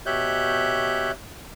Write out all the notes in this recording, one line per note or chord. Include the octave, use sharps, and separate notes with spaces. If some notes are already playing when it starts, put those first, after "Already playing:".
B2 G4 C#5 E5 F#6 G6